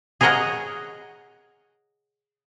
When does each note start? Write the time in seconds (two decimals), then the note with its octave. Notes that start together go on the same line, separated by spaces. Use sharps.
0.21 G#4 A#4 C#5 D#5 F#5 A#5